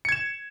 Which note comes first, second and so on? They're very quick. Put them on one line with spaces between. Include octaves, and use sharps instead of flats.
C#7 G#6 E7